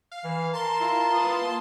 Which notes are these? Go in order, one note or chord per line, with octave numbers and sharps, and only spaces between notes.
F5
E3
A#4 A5 C6
E4 F4
F4 B4 D#6
A#3